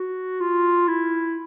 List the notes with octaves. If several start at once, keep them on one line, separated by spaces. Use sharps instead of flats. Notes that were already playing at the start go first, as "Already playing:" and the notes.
Already playing: F#4
F4
E4